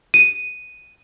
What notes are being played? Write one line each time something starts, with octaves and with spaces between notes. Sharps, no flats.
D#7